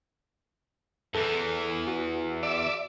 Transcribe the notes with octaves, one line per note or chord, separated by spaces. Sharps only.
E2 E3 A4
F#4
D5 E5